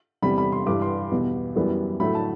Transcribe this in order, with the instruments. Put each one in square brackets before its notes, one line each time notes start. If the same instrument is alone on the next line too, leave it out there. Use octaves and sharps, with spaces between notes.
[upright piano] E2 C3 G3 B5
B5
C6
G2 E3 G3 D6
C6
E2 B2 G3
F#2 E3 G3 B3
A2 F#3 A3 B5
A5